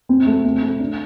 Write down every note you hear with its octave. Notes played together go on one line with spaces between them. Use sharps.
C4
A3
C4
A3
D4